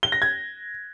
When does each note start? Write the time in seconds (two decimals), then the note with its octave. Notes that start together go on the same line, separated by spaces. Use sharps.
0.03 G7
0.12 A#6
0.22 G#6